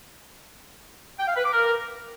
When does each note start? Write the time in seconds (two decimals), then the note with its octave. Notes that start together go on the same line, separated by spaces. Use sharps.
1.19 G5
1.28 F5
1.36 B4
1.45 D6
1.53 A#4